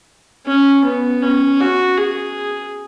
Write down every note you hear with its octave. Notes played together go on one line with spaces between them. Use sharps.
C#4
B3
C#4
F#4
G#4